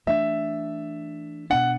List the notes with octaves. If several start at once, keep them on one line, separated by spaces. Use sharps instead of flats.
E3 A3 D4 E5
B2 B3 D4 F#5